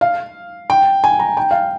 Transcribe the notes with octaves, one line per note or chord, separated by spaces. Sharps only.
F5
G5
G#5
A#5
G5
F5